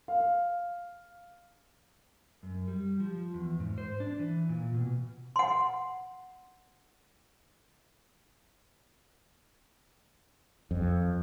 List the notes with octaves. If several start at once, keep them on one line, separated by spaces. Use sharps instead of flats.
F5
F#2
G3
F3
E2
G#2
C5
D4
E3
A#2
B2
F#5 C6
F2